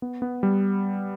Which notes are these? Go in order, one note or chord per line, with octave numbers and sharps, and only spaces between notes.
B3
B3
G3